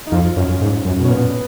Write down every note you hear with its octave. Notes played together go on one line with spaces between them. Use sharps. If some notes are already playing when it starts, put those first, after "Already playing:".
D#4
F2 F4
F#2 C#4
G#2
F#2
B2 C#4
A#2 B3